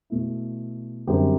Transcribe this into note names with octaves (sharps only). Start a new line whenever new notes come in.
B2 A3 E4
F#2 D3 G3 C4 G4